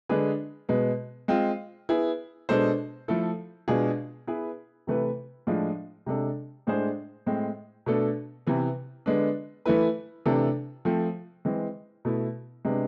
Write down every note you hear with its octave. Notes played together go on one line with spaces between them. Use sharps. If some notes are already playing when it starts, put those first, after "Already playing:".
D3 G#3 D4 G#4 B4
B2 G#3 B3
G#3 C4 F4
B3 E4 G#4
B2 G#3 D4 A4 C5
F3 A3 E4 A4
B2 G#3 D4 F4 G#4
B3 E4 G#4 B4
C3 E3 A3 E4 B4
A2 F3 G#3 D4 F4
C3 G#3 D4 A4
A2 G#3 D4 G#4 C5
A2 G#3 C4
B2 A3 D4 A4
C3 E3 B3
D3 G#3 B3 D4
E3 A3 E4 B4
C3 E3 A3 D4 A4
F3 A3 C4
E3 G#3 C4
B2 A3 E4
C3 G#3 B3 D4